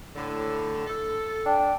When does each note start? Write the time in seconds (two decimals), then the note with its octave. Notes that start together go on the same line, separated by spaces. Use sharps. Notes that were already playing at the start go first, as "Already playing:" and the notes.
0.16 A2 D3
0.87 A4
1.46 D4 G5